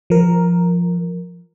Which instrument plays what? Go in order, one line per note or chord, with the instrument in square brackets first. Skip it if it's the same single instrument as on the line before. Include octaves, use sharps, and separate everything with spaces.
[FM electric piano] F3 A#4